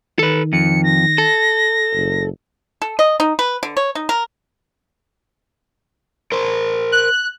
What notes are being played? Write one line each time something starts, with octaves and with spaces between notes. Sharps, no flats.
D#3 A4 B4
F2 C#7
A#6
A4
F#1
A4
D#5
D#4
B4
D3
C#5
D#4
A#4
A#4 C5
F#6